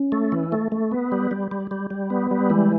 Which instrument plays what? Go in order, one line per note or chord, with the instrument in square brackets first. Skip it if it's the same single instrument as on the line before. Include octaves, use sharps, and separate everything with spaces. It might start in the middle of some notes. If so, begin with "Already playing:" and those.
Already playing: [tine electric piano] C#4
[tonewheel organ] A3
E3
A3
A3
B3
G3
G3
G3
G3
G3
B3
G3
[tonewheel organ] E3 [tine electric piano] G#3